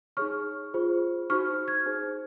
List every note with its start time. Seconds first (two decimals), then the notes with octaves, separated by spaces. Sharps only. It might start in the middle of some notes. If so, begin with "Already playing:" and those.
0.17 D#4 G#4 C#5 C#6 F6
0.74 F4 G#4 C5
1.30 D#4 F#4 C5 C#6 F6
1.68 F6 G#6
1.86 D#4 G#4 C5